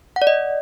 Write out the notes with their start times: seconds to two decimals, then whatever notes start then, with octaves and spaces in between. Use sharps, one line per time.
0.16 F#5
0.22 D5
0.27 D#5